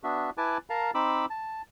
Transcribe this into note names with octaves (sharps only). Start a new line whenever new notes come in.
B3 D4 F#4 E5
E4 B4 G#5 A5 D6
A#4 F5 A5 A#5
C4 D#4 B5 D6 E6
A5